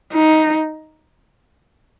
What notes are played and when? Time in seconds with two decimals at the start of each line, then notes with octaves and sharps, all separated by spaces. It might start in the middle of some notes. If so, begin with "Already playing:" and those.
0.13 D#4